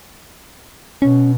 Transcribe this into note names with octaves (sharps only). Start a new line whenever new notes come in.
B2 C#4